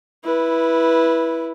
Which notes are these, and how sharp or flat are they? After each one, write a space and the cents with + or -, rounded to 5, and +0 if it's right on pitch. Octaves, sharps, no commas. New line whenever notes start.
E4 +0 B4 -15